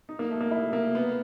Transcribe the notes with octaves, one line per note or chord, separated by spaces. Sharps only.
D#4
A#3
A3
A#3
E4
A#3
B3